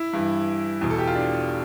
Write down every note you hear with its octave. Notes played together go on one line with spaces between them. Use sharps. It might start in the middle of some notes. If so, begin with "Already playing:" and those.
Already playing: E4
G2 E3
E2 B2
A4
G4
F4
D4